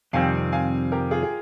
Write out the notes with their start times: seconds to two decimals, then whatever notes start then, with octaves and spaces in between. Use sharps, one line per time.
0.13 F2 C3 D#3 G3 C4 F5 G#5
0.52 F5 G#5
0.92 G4 A#4
1.11 F4 G#4
1.23 G#4